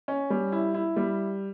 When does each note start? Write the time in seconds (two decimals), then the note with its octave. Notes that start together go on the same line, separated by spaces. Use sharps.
0.08 C#4
0.30 G3
0.52 E4
0.74 E4
0.96 G3